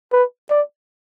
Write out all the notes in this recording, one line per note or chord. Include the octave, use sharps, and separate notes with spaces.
B4
D5